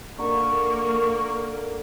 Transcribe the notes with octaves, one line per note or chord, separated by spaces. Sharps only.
D3 A#3 A#4 C#6